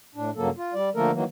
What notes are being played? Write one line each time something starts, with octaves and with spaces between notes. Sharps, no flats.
A2 D4
G2 C#3 F#3 A#3 A4
F4
G3 D5
D3 F3 A3 A#3 A4 A#4
D#3 E3 F#3 A#3